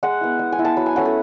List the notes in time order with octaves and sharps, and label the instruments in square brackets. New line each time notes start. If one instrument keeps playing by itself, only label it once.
[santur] G#3 F#5
B3 E4
G#3
G#5
B3 E4
A5
F#3 B5
G#5
A3 C#4 E4 F#5
A4